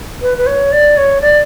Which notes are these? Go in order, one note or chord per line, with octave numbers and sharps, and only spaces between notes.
B4
B4
C#5
D5
C#5
D5